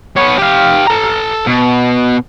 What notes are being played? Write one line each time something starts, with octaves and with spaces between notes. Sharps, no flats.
B3 C#5
G4 F5
A4 A#5
B2